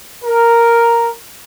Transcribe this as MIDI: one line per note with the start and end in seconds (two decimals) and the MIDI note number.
0.25 1.10 70